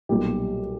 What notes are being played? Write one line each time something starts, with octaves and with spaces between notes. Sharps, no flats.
B1 A#2 G3 G4